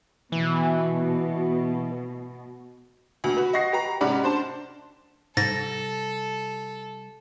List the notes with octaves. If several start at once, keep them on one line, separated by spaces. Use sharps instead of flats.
B2 E3
D2 B2
F#4 B4
D#5 F#5 C#6 A#6 C7
G4 B4 A#5
G#2 C3 C#4 D5 F#5 B5
D4 C5 A5
G#2 C3 G3 A4 A6 A#6